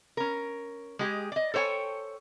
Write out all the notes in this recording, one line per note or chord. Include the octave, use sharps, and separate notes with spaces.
C#4 A#4
G#3 G4 G#4
D5 D#5
A4 C5 C#5 G5 G#5